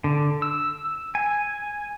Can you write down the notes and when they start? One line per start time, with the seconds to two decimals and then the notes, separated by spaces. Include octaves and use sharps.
0.04 D3
0.42 E6
1.15 G#5